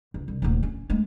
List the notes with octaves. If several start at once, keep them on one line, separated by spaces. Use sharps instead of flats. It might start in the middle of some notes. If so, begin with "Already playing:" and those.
C#2
C2
D#1 D2
C#4
G#3 A3